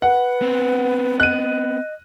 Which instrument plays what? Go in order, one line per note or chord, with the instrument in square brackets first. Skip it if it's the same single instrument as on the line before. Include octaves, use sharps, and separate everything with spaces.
[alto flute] B4 [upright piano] F#5
[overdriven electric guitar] B3 C4
[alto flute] D#5 [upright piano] F#6 D#7